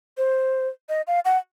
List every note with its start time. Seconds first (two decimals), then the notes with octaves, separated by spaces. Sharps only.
0.17 C5
0.89 D#5
1.07 F5
1.25 F#5